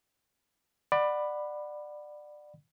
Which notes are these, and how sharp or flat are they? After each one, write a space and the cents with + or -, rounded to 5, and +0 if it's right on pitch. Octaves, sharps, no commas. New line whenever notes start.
D5 +25 F#5 +0 B5 +0